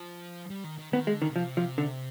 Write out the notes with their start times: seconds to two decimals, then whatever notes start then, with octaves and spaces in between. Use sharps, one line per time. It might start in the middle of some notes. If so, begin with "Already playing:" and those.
Already playing: F3
0.50 G3
0.64 D#3
0.79 D#3
0.92 D#3 B3
1.07 G#3
1.14 D3
1.22 D#3
1.29 B2
1.35 C3 F3
1.57 F3
1.78 D3